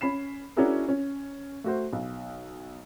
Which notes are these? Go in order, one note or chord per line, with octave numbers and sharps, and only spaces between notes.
C#4 B5 C7 E7
C#4 D4 E4 F#4 G#4 A#4
C#4
A3 F#4 C5
B1